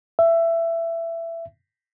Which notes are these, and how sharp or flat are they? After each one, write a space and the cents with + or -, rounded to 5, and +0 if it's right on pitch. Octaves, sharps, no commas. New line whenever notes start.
E5 +15